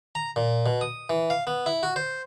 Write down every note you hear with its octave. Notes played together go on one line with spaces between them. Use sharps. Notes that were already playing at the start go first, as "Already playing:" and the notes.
A#5
A#2
B2
D#6
E3
F5
B3
E4
F#4
C5